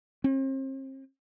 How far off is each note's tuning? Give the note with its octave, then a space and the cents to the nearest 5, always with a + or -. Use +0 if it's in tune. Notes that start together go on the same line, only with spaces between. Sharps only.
C4 +40